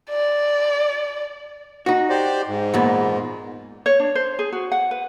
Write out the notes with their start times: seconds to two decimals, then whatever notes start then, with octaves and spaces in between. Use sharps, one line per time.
0.10 D5
1.86 D#4 F#4
2.10 G4 C5 D5
2.48 G#2
2.74 E2 A#2 B3
3.86 C#5
4.00 D4
4.15 C5
4.39 G#4
4.52 F#4
4.72 F#5
4.91 B4